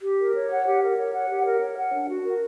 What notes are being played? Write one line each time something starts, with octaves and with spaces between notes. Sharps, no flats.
G4
A#4
C#5
F#5
G4
A#4
C#5
F#5
G4
A#4
C#5
F#5
D4
F#4
A#4